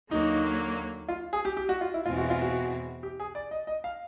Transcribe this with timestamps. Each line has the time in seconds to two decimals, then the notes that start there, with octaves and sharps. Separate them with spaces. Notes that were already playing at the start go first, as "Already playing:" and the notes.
0.11 D#2 D3 F#3 A#3 D#4
1.09 F4
1.33 G#4
1.45 G4
1.57 G4
1.69 F#4
1.81 F4
1.94 E4
2.06 E2 B2 G#3 C4 F4
2.18 F#4
2.30 F4
2.42 F#4
3.03 G4
3.20 G#4
3.35 D5
3.51 D#5
3.67 D#5
3.84 F5